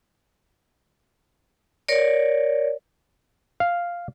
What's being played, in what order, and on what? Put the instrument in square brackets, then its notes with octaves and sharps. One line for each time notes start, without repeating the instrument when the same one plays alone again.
[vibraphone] A#4 C#5 D5
[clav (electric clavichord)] F5